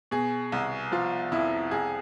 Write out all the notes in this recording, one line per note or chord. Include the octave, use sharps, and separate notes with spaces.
B2 G#4
C2
F3 F4
F2 E4
C2 G#4